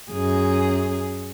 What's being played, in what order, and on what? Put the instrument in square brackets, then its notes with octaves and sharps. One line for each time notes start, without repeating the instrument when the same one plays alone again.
[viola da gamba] F#2 G#4